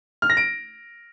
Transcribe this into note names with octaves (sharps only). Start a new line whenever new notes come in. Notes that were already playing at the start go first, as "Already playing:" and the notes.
F6
A#6
D7